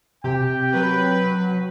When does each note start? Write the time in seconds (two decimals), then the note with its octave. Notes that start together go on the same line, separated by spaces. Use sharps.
0.24 C3 G4 G5
0.74 F#3 B4